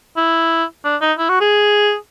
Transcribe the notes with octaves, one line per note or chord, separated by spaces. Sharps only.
E4
D4
D#4
E4
F#4
G#4